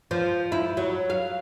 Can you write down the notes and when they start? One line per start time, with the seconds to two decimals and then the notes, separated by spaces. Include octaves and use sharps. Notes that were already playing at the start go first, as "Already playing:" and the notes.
0.11 F3
0.52 E4
0.77 F#3
1.10 F5